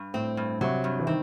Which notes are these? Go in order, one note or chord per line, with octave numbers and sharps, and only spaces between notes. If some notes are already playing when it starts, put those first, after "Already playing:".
Already playing: G2
A2 C4
G2
C3 F#3
G2
E3
D#3 C4